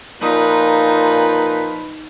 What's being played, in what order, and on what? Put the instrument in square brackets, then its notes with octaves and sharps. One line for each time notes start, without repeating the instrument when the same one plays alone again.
[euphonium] A#2 [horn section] F3 F4 B4 [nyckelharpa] D#4